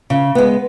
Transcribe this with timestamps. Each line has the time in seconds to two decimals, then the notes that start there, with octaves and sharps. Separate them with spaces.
0.10 C#3
0.35 G#3 B3